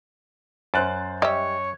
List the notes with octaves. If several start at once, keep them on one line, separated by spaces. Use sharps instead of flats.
F#2 C5 F#6 A6
G3 C#5 D#5 E5